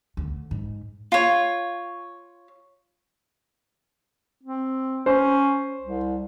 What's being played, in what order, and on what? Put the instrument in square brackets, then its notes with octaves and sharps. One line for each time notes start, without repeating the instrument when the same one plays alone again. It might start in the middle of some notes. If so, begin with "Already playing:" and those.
[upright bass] D2
G#2
[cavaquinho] F4 C#5
[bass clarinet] C4
[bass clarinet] C#4 [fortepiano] C5
[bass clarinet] C2